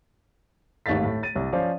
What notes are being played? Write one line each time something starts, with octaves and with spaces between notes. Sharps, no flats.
G#1 D#2 A3 F5 A6 B6
A2
A6 D#7
C2
F3 C#4 C5 D5 F5